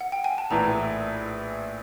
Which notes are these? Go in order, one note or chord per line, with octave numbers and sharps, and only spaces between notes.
F#5
G5
G#5
A5
A#1 A2 E3 A#5